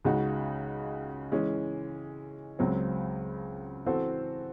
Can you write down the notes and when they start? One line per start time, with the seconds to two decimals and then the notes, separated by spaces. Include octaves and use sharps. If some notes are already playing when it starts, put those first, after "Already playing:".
0.05 C#2 C#3 G#3 D#4 F#4
1.32 E3 G#3 C#4
2.59 C#2 C#3 F#3 C4
3.86 E3 C4 F#4 A4 C5